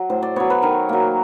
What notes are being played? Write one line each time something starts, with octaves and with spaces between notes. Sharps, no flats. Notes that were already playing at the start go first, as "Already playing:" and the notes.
Already playing: F#3
A2 C5
D5
F#3 B3 C#5
B4
D#3 A#4
F#3 A#3